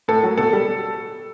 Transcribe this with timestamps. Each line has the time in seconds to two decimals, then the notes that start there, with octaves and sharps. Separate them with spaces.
0.08 A2 A4
0.23 F#3
0.38 B2 A4
0.53 G3